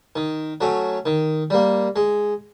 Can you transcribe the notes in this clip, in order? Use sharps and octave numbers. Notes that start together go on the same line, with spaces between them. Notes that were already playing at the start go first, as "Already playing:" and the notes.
D#3
F#3 A3 C#4
D#3
G3 A#3
G#3